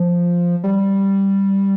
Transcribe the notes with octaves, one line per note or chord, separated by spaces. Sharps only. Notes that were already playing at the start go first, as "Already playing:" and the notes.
Already playing: F3
G3